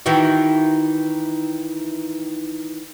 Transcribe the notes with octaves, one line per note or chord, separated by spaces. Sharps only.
D#3 E3 F#4